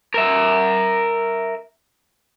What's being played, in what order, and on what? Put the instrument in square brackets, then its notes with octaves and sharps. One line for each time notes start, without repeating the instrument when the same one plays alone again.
[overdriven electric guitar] A#4 E5